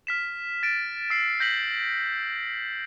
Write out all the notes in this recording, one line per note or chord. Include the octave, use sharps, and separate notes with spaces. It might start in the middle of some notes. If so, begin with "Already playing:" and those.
F6 B6 E7
A6 D7
E6 C7
G6 A#6 B6 F#7